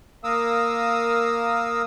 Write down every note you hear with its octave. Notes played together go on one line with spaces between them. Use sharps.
A#3 A#4 F5 D#6 E6